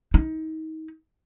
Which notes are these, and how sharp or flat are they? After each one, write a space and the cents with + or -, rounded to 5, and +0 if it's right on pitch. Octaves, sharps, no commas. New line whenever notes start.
D#4 +30